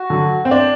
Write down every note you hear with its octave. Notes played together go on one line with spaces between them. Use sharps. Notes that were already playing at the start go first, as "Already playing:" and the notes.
Already playing: F#4
D3 F#3
C4
D4